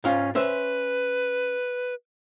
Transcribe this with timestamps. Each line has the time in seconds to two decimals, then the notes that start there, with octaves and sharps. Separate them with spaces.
0.04 G#2 C#4 F4 F5
0.35 C#4 B4 C5 E5